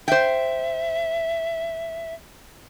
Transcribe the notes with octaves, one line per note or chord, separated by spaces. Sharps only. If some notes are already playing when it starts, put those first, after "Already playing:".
C5 E5 G5